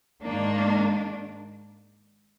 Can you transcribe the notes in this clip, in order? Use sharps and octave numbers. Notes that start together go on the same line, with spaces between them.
G#2 D#3 A#3 D4